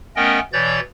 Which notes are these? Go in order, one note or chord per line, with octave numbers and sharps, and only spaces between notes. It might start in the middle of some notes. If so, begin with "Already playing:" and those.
A3 B3 C#4 A#4 D#5 G5
B2 E3 C#5 D5 G6 A6